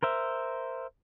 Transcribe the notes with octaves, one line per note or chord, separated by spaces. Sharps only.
A#4 C5 E5